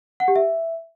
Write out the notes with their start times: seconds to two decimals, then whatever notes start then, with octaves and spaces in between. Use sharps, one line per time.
0.20 F#5
0.28 G4
0.36 E5